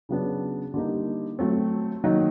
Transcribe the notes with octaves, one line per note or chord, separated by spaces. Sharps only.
C#3 F#3 B3 D4
D3 G3 A#3 D#4
F#3 A3 C4
D#3 F#3 A#3 D#4 F#4